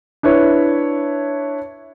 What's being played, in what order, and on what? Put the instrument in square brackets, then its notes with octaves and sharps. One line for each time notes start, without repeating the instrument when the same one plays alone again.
[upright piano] D4 E4 B4 C#5